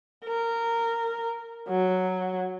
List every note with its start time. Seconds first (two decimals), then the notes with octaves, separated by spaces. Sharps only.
0.26 A#4
1.69 F#3